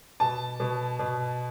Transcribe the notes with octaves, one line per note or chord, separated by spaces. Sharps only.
B2 A5
B2
B2